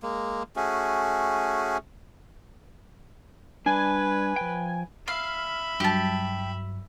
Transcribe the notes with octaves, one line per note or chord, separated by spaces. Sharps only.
G#3 A#3
A3 C#4 F#4 G#4
G3 D4 B4 G#5
F3 G5
E5 F5 B5
G2 F#3 G4 A5